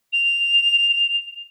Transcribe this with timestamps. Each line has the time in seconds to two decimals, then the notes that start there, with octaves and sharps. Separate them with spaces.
0.12 F7